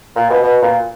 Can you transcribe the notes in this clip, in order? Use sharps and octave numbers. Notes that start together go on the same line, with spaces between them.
A#2
B2
B2
A#2